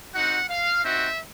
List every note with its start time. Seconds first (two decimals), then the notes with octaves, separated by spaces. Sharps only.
0.15 C4 D#4 F#4 F#5
0.50 F5
0.84 C4 D#4 F#4 E5